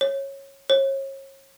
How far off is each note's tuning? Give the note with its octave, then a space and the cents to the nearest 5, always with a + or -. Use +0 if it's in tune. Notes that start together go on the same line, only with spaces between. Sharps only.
C#5 -15
C#5 -35